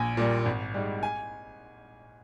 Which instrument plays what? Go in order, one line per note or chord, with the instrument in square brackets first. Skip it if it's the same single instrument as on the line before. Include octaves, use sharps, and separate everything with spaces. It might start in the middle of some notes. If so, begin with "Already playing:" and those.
Already playing: [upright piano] A#1 G#5
A#2 G3 A#3
G#1
G#2 G3
G#5